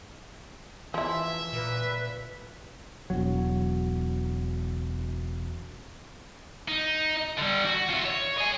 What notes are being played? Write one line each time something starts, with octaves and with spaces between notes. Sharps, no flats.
E3 F3 E4 E5
A#2 B4
E1 F#3
D#4
D3 G3
F#4
F4 E5
C#5
D#5 G#5